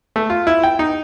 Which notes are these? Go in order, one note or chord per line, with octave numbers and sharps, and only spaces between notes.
A3
F4
E4
G5
D#4